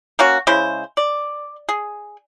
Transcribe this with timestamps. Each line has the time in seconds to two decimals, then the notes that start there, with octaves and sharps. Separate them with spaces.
0.19 A#3 C#4 F#4
0.47 C#3 G#3 E4 C5
0.97 D5
1.69 G#4